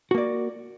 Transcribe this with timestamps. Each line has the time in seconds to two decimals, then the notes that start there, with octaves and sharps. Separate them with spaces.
0.11 F#4
0.14 A#3
0.18 D5